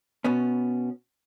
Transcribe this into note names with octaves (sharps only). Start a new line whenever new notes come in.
B2 B3 C#4